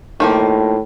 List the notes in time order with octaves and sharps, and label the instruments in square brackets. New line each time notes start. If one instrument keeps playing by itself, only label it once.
[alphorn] A2 [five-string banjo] D#3 F3 A#3